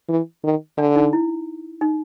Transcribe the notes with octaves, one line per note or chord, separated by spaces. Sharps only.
E3
D#3
D3 D4
D#4
E4
D#4